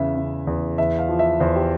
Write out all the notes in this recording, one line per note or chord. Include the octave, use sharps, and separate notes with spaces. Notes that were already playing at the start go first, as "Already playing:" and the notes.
Already playing: E2 C#3 E5
C#3
E2
E2 E5
F5
F3
E5
E2 C5
G4